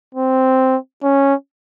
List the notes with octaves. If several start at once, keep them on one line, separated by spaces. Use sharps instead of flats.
C4
C#4